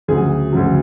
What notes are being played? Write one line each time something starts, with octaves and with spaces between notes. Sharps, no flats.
D2 C#3 F#3 G#4
D2 C#3 F#3